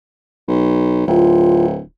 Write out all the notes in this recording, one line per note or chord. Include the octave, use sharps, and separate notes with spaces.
B1
D1 F4